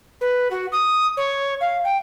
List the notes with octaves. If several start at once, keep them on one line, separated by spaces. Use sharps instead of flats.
B4
F#4
D#6
C#5
F5
G5